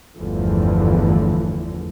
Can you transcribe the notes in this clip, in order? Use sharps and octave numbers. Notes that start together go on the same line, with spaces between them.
G1 E2 D3 E3 F3 A3